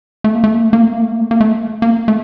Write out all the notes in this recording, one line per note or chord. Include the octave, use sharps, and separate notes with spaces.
A3
A#3
A3
A#3
A3
A#3
A3
A#3
A3
A#3
A3
A#3
A3
A#3
A3